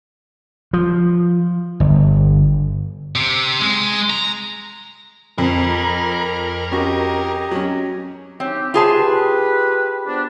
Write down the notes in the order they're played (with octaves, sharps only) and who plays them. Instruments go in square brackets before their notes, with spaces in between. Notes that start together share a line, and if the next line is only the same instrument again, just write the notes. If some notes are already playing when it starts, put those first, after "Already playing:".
[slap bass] F3
G1
[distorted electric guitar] C3
G#3
A#5
[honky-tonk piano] F2 [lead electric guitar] A#4 [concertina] B5
[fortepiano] C#4 F#4 [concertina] G4 D#5
[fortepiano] F#3 C#4
[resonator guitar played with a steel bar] C4 [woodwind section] C#4 D#4 G4
[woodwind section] C3 C6 [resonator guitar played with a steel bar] F4 G#4 A5
[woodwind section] G4 B4
F3 B3 D4